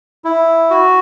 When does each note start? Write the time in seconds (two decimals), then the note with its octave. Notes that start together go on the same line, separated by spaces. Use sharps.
0.25 E4
0.70 F#4